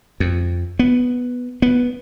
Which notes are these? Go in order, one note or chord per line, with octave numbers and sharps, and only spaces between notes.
F2
B3
B3